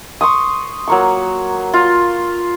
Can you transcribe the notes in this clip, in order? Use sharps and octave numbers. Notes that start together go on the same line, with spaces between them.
C6 C#6 D#6
F#3 A#3 C#6
F4